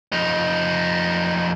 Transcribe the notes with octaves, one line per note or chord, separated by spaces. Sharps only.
F2 D#4